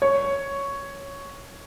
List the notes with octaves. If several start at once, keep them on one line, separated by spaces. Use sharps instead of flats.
C#5